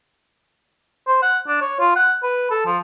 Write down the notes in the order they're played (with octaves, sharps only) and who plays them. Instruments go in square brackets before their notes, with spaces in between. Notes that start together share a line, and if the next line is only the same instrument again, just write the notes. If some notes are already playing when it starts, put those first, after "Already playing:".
[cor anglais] C5
F#5
D4
C#5
F4
F#5
B4
A4
F3